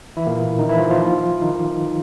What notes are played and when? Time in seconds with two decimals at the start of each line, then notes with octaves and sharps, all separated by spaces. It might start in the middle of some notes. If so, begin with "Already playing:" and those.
0.17 E3 E4
0.27 A#2 A#3
0.59 D#3 D#4
0.69 E3 E4
0.79 F3 F4
0.90 F3 F4
1.42 D#3 D#4